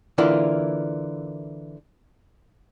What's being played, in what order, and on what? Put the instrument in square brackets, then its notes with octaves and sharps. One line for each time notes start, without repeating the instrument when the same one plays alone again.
[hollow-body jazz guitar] D3 E3 A#3 E4 F4